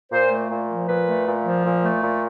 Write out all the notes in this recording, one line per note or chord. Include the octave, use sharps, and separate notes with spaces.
A#2 C5
A3
A#2
F3
A#2 B4
A3
A#2
F3
A#2
A3
A#2